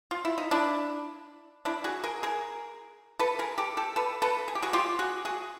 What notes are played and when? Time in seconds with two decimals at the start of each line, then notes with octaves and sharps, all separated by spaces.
0.11 F4
0.25 E4
0.38 D#4
0.51 D4 E4
1.65 D4 E4
1.84 F#4 G#4
2.04 G#4 A#4
2.23 G#4 A#4
3.19 A4 B4
3.39 G#4 A#4
3.58 G4 A4
3.77 G4 A4
3.96 A4 B4
4.22 A4 B4
4.48 G#4
4.55 G4
4.62 F#4 G#4
4.73 F4 G4
4.99 F#4 G#4
5.25 F#4 G#4